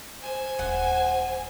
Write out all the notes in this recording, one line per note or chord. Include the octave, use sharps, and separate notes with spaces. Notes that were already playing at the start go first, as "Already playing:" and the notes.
C5 G#5
D#1 F#5